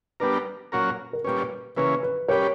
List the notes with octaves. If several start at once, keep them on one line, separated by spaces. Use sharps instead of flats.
G3 B3 D4 A#4 B4
A#2 F#3 C#4 F#4 A#4
A#4
A#2 G3 C#4 B4
C#3 E3 A#3 C#4 B4
B4
G3 C#4 G4 A#4 B4 C#5